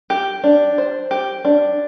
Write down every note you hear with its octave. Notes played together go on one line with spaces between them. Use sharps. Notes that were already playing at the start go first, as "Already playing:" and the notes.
G4
D4
C5
G4
D4